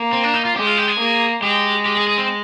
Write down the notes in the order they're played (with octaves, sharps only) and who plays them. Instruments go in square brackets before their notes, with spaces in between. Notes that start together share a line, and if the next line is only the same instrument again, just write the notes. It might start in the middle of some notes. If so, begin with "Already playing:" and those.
Already playing: [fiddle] A#3
[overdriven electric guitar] C4
D4
D#4
F4
[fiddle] G#3 [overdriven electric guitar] G4
[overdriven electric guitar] F4
G4
G#4
[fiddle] A#3
[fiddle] G#3 [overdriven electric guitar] G4
[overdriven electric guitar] G4
G#4
G#4
C4